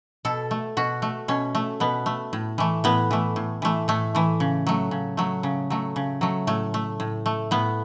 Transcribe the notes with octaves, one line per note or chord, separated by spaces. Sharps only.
B2 A4
A3
B2 F#4
A3
B2 C#4
A3
B2 B3
A3
A2
E3 A3
A2 B3
E3 A3
A2
E3 A3
A2 A3
E3 A3
C#3
F#3 A3
C#3
F#3 A3
C#3
F#3 A3
C#3
F#3 A3
A2 A3
A3
A2
A3
A2 B3